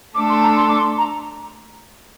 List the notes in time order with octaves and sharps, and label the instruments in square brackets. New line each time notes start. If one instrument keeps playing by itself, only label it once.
[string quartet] A3 D4 A4 [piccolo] D6
[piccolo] C6
A#5
C6
D6
C6
A#5